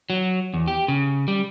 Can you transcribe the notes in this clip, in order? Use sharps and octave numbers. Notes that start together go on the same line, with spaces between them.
F#3
E2
G4
C#3
G3